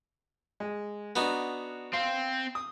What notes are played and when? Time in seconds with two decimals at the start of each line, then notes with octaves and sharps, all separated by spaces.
0.60 G#3
1.16 B3 D4 D#4 F#4
1.94 C4 F5
2.55 D#6